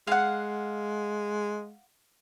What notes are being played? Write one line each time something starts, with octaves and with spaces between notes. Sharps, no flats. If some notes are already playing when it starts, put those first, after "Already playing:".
G#3 F5 F#5